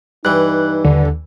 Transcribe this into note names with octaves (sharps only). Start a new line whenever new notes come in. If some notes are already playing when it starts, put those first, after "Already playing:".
G2 E3 D#4 F#6
D#2 D3